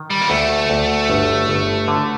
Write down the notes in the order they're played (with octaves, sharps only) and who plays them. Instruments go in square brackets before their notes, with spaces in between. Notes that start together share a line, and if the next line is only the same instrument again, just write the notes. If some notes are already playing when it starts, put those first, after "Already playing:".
Already playing: [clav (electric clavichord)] D#3
[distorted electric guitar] G3
A#3
[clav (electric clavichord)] D2 [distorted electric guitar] A3
[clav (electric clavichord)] D2
G1
G1
D3